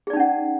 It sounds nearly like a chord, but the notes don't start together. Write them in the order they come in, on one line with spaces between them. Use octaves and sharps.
G#4 D5 D#4 C#4 F#5